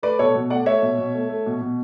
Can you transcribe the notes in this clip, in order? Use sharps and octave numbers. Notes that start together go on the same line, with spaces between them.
A3 B4 D5
B2 A4 C#5
B2
A3 D5 F#5
A3 C#5 E5
B2
B2
A3
A3
B2
B2